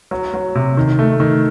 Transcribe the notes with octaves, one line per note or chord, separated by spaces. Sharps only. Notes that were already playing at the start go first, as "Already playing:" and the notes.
F#3
F#3
C3
D#3
A3
D#3